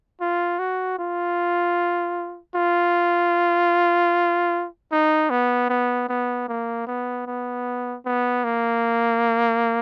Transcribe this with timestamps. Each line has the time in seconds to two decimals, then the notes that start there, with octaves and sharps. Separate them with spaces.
0.21 F4
0.59 F#4
0.99 F4
2.55 F4
4.92 D#4
5.30 B3
5.69 B3
6.09 B3
6.48 A#3
6.87 B3
7.27 B3
8.05 B3
8.44 A#3